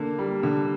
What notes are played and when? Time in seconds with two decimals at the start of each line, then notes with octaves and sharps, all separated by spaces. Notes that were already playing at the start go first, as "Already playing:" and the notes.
Already playing: D3 A#3
0.19 G3
0.43 D3